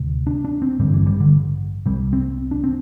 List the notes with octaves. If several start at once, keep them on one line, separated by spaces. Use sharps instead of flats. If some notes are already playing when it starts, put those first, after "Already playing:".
Already playing: D2 C3
D4
D4
C4
A1 G2 D3 G3
E3
G3
D3
C2 C3 G3
C4
D4
C4